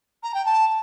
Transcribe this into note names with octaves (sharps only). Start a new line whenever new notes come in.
A#5
G5
A5